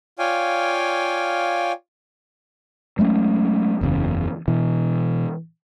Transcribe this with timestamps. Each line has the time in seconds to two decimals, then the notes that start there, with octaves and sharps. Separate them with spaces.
0.19 F4 C#5 D5 F5 G5 G#5
2.99 F#3 G#3 A3 C#4
3.81 F#1 E2 G#2 C#3
4.48 B2 E3